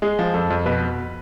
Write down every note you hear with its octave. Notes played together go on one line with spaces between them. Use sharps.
G#3 G#4
F3
F2 A4
F2
B2 B4